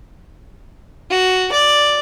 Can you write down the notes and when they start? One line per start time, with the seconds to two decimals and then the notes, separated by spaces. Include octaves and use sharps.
1.10 F#4
1.52 D5